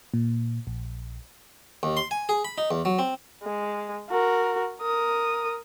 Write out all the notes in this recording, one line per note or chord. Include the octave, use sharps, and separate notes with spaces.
A#2
A#1
D#2
C6
G#5
G#4
B5
D#4
E2
F#3
C4
G#3
F#4 A#4
A#4 D#6